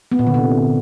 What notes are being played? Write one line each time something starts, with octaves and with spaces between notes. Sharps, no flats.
B3
A#2
D3
C3